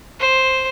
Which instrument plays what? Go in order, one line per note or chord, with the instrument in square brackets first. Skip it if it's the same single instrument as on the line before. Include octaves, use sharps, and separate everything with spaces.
[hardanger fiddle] C5